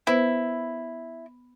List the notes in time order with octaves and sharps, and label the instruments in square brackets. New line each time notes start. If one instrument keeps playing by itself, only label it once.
[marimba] B3 B4 C5 [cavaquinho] E4